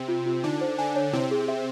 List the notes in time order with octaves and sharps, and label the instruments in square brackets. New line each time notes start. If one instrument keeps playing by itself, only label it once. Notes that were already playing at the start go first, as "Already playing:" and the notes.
Already playing: [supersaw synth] C3 C4
[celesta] F4
F4
[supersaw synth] D3 D4 [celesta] D#4
[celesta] C5
[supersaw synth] D3 D4 [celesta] G#5
[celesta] C#5
[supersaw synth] C3 C4 [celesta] E4
[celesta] G#4
E5